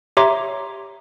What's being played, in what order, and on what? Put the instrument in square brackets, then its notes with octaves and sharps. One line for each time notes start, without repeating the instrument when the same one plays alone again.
[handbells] G4 C#5 E5 A#5 C6 D6